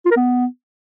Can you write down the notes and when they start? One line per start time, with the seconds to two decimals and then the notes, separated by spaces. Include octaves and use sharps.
0.06 F4
0.11 A#4
0.16 B3